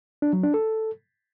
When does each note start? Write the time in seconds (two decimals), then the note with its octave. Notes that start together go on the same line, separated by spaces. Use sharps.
0.22 D4
0.33 F#3
0.43 D4
0.54 A4